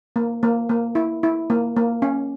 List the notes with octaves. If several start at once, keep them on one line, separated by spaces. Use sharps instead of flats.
A#3
A#3
A#3
E4
E4
A#3
A#3
C#4